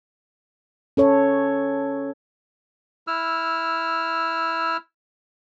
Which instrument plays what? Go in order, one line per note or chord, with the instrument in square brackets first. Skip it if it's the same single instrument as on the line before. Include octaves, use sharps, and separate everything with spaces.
[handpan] C#4 A4 C#5
[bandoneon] E4 E6 F6